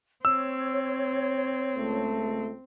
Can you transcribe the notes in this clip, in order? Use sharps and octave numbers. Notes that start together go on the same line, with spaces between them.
C4 C#5 E6
C#2 A3